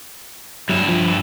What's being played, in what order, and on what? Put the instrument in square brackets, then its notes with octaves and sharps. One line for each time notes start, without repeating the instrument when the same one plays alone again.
[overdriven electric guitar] G2 E4 [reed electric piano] F#3
[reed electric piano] F3